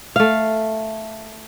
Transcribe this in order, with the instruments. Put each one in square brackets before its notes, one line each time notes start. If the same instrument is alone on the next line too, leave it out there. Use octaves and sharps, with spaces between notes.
[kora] A3 F5